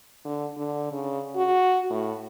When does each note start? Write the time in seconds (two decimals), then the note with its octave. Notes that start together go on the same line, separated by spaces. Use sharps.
0.25 D3
0.57 D3
0.92 C#3
1.36 F#4
1.90 A2